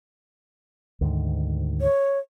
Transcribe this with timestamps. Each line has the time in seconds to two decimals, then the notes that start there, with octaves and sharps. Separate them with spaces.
1.01 D2 G#2 D#3
1.81 C#5